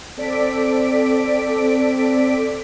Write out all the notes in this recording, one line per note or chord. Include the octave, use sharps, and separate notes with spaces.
C4 A4 D5 B6 D7